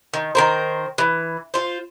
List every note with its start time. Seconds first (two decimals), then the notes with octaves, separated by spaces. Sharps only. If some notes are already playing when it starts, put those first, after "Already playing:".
0.14 D#3
0.35 D#3 A#4 C5
0.98 E3
1.54 F4 C5